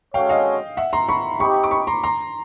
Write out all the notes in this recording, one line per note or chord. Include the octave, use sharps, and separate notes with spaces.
G#3 C#4 F#4 A4 C#5 F5 G5
D#5 F5
E5 F#5
A#5 C6
B5 C#6
C4 D#4 G4 B5 C#6
D6
B5 C#6
A#5 C6
A#5 C6